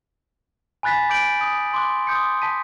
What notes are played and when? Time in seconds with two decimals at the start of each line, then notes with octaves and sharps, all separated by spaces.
0.83 G#5 B5 F#6 A6 B6
1.10 D6 G6 D7 F#7
1.41 D#6
1.74 C6 D6 F#6
2.07 C6 D#6 G6 C#7
2.42 A5 B6 D#7